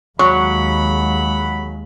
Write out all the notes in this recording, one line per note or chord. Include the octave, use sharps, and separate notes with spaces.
D#2 F#3 G#3 F#5 B5 C#6